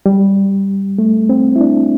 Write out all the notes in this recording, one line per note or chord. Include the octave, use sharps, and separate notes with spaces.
G3
A3
C4
E4
D4